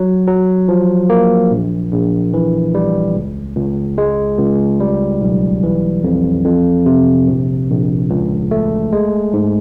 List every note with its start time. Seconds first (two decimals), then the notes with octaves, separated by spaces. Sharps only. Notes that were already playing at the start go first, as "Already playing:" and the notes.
Already playing: F#3
0.27 F#3
0.68 F3
1.10 A#3
1.51 A#1
1.92 A#1
2.34 E3
2.75 G3
3.16 C#2
3.57 C#2
3.98 G#3
4.39 C#2
4.80 G3
5.21 B1
5.63 E3
6.04 F2
6.46 F2
6.86 C3
7.27 A#1
7.69 A#1
8.10 C#2
8.51 A3
8.93 G#3
9.33 G#2